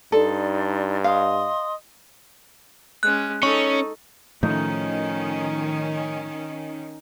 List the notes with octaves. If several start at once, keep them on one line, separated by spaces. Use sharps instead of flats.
G2 D#4 A4 D5 C6
D#5 F5 C6 D#6
G#3 C#4 F#6
C#4 D#4 A4 C#6
A2 D#3 F3 A3 C#4 D#4 D#5